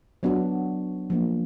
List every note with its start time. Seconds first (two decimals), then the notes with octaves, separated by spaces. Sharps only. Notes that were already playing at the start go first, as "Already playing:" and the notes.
0.23 F#3 B3 D4 F#4
1.10 F3 A#3 D4